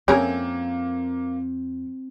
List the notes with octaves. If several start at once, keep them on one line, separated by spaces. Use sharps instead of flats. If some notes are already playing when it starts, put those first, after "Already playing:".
F2 A#3 C4 C#4 G#4 A#4 G#6